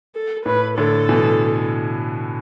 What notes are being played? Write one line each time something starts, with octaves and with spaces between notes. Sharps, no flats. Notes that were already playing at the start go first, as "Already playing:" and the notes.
A4
A2 B4
A2 D3 A4
B2 E3